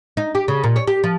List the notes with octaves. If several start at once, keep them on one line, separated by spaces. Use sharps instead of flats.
D#4
G4
C#3
A#2
C#5
G4
F3